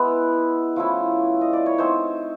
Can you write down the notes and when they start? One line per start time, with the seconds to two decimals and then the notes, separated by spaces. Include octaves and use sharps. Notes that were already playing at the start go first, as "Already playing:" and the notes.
Already playing: G#3 B3 E4 B4
0.76 F3 A3 C#4 E4
1.41 D#5
1.53 D5
1.66 C#5
1.78 A3 C4 D#4 C5